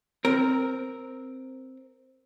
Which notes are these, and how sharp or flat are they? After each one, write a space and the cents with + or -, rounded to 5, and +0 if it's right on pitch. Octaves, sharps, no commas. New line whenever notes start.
C4 +0 A#4 +0